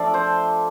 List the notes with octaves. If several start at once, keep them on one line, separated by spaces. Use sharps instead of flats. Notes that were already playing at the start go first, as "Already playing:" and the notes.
Already playing: F3 A3 D4 F4 D5 E5
C5